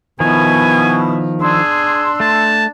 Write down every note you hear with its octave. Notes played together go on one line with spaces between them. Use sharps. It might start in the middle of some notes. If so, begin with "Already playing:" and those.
B2 D#3 F3 B3 E4 G#5
D4 G#4 C6 E6
A3 A5